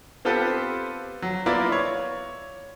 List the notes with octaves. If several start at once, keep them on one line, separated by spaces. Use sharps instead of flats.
B3 C4 F4 G4 A4 B4
F#3
A#3 B3 E4 F4 A#4 D5
C#5